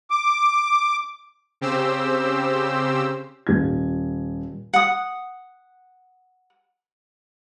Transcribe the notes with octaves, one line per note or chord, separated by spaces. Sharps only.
D6
C#3 C4 G4 C5 E6
D#1 G#6
F#5 D#6